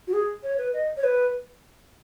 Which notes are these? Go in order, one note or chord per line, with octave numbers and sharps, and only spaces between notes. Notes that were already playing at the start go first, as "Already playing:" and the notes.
F#4
G#4
C#5
B4
D#5
C#5
B4